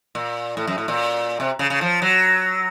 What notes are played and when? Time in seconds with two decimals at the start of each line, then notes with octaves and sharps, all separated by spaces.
0.15 A#2
0.57 A2
0.67 F#2
0.78 A2
0.88 A#2
1.40 C3
1.59 C#3
1.70 C#3
1.81 F3
2.02 F#3